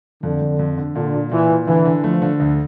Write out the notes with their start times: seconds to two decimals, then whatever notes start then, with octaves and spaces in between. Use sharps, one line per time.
0.23 F2 D3
0.41 F2
0.59 F2
0.77 D3
0.96 A#2 D3
1.14 A#2
1.31 A#2 E3
1.50 A#2
1.67 D3 E3
1.85 D3
2.04 F3 A3
2.22 D3
2.40 D2